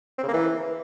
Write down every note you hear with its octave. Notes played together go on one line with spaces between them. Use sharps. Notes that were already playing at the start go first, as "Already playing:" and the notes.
C4
C#3
A#3
E3